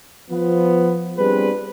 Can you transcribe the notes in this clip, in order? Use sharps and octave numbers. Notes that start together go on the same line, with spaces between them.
F3 B3
G3 B3 C4 D4 G#4 B4